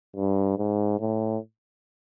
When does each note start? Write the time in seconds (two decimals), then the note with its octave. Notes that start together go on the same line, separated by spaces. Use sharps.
0.16 G2
0.58 G#2
1.00 A2